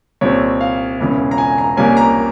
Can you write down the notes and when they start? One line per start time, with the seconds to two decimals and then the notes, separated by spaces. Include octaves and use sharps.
0.21 C2 A#2 G3 C4 C#5
0.61 F5
1.00 E1 E2 C#3 E3
1.31 A#5
1.38 G#5
1.58 A#5
1.77 C2 C3 G3 A#3 C#4 G#5
1.97 A#5